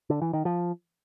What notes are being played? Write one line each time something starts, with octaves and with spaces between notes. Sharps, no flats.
D3
E3
D#3
F3